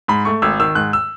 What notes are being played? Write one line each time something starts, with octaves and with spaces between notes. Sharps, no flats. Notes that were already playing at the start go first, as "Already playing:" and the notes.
G#2 B5
A3 C#6
G#1 E6
D#3 E6
G#2 F#6
E6